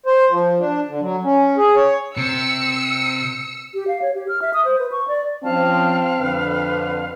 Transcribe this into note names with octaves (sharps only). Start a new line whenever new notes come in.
C5
F3
D4
D3
F#3
C#4
G#4
C#5
C3 E6 C#7
G4
F5
C#5
G4
F6
E5
D#6
C5
B4
C#6
D5
F3 C4 C#4 F5 A5
F2 D3 B4